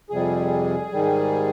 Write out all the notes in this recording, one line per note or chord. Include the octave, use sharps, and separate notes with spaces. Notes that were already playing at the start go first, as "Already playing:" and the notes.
F2 C3 G3 G#4
G#2 D#3 G3